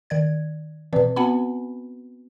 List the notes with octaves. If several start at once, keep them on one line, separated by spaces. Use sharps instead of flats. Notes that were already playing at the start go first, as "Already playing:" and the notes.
D#3 D5 G#6
B2 E3 C4 B4 D5
B3 C4 F#4 F#5 G#5 B5